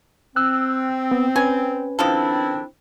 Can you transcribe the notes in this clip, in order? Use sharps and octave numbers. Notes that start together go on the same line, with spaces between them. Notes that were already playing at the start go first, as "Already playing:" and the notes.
C4 E6 F#6
B3
C#4 B4 G#5
D#3 F3 C4 D4 E4 A4